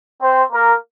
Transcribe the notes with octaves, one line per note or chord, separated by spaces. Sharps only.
C4 C5
A#3 A#4